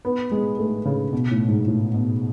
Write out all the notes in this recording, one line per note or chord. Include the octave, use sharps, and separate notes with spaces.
B3
G#3
A3
C#3
B2
A2
G#2
A2
B2